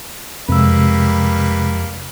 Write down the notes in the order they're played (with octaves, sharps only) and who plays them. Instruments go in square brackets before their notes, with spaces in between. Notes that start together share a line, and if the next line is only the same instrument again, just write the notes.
[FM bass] F2 [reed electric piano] C3 G#3 E6 [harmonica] G3 A#3 B4